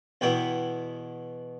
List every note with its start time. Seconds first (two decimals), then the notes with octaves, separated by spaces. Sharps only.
0.21 E2 B2 B3 E4 G5